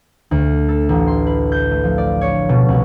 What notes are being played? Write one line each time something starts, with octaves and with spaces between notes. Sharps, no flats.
D2
A4
A1
C6
B4
G6
A3
F3
D5
C#5
B2
C2